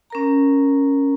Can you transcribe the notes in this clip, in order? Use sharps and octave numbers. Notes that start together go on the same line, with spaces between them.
C#4 A#4 A#5